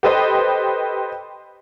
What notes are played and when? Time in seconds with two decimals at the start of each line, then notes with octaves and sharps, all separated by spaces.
0.03 G4 A4 B4 C5 D#5